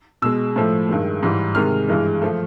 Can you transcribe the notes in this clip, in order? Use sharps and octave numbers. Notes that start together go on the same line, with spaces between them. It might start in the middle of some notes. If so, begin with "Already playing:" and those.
B2 G#3 E6
A2 F3 A3
G2 D#3 G#3
G#2 E3 G3
C3 D#3 G#3 F6
G2 E3 G#3
F3 A3